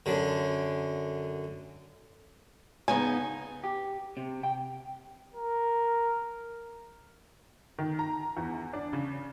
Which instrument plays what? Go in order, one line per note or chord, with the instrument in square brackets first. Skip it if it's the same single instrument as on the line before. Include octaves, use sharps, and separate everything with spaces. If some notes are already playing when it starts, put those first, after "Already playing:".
[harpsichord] F#2 D3
[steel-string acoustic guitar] C#3 B3 D#4 [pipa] G#5
[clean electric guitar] G4
C3
G5
[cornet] A#4
[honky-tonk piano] D#3
A#5
E2
D4
C#3